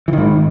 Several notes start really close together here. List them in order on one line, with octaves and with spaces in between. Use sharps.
E3 D#3 G#2